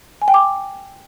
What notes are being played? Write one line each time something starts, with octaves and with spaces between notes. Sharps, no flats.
G#5
G5
D6